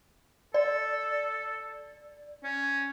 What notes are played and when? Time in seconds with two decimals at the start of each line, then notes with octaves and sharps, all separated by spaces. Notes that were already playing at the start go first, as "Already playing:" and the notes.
0.54 A4 D5
2.43 C#4